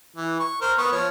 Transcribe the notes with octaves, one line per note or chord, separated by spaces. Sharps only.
E3
C#6
A#4 C5
B3 C#6 D#6
F3 C#5